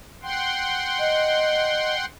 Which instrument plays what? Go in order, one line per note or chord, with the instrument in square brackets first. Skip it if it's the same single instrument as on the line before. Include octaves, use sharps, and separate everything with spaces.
[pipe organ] F#5 G5 C6
[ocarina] D#5